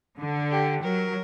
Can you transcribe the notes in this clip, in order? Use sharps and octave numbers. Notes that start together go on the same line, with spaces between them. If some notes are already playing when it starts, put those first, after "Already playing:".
D3
G4
F#3 A#4